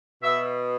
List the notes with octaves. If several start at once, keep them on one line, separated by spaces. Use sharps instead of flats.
B2 E5